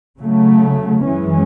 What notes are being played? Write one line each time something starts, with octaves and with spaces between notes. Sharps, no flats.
C#3 F#3 A3
F#2 E3 G#3 C#4